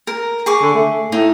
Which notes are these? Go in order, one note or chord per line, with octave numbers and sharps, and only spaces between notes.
A#4
G#4 C#6 D6
D3
A3
A2 D#4